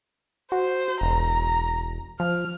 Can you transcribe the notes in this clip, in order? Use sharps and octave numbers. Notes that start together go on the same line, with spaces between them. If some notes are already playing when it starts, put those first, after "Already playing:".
F#4 C5
E1 A#5
F3 F6